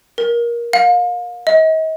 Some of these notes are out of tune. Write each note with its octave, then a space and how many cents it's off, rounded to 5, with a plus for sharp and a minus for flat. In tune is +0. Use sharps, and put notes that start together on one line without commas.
A#4 +20
F5 +35
D#5 +40